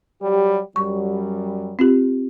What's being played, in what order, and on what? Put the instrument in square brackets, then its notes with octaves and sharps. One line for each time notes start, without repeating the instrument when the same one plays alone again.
[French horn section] F#3 G3 G4
[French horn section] F#2 F#3 G3 [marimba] C#6
[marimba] C4 F4 G4